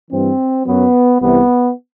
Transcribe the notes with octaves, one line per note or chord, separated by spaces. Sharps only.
G2 E3 C4
F#2 F#3 B3
C2 C3 E3 B3